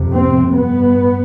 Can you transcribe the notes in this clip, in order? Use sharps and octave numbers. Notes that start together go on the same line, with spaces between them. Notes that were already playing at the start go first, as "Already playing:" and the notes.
Already playing: F2 C3
C4
G2 B3